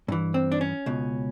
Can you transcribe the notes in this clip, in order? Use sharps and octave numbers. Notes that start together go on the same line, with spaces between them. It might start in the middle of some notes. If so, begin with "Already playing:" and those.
G2 E3
C4
D4
C#4
C#2 B2